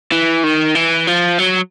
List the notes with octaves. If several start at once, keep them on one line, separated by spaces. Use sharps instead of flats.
E3
D#3
E3
F3
F#3